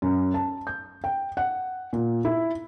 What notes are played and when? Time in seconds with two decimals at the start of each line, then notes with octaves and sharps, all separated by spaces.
0.02 F#2
0.34 A5
0.67 G6
1.04 G5
1.37 F#5
1.93 A#2
2.25 E4